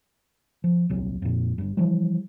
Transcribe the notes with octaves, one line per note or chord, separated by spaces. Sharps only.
F3
D#1 C2 F#3
F2 A#2
G1 G2
E3 F3 G3